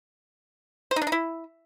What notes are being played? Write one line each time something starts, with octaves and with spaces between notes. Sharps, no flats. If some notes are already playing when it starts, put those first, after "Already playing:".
C5
D#4
D4
D#4
E4